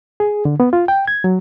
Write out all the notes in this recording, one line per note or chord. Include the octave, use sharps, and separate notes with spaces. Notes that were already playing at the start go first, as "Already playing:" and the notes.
G#4
D3
B3
F4
G5
G#6
F#3